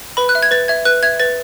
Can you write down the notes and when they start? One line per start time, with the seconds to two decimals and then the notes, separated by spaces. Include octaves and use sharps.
0.17 B4 B5
0.29 F#6
0.35 E5
0.43 G#6
0.51 B4 A6
0.68 E5 G#6
0.85 B4 F#6
1.03 E5 G#6
1.20 B4 A6